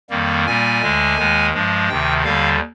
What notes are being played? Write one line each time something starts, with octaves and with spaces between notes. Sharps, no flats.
F2 D#3 G3 A#3
A#2 G3 A#3 G#5
D2 D3 G#3
D#2 D#3 G#3
G2 F3 G#3
D2 C3 D#3 G5
D#2 D3 G3 F5